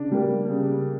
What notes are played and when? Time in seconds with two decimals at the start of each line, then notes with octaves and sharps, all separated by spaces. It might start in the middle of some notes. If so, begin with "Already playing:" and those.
Already playing: C#3 D4
0.11 G3 A#3
0.49 C#3